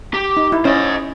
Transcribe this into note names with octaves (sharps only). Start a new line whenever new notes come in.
G4
D#4
E4
C#4 C5 D#5